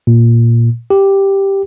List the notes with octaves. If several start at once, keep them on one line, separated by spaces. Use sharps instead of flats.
A#2
G4